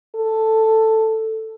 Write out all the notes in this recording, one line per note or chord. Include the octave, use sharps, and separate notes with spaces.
A4